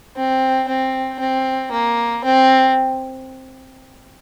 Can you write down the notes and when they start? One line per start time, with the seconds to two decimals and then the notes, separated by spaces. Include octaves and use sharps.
0.16 C4
0.68 C4
1.20 C4
1.72 A#3
2.24 C4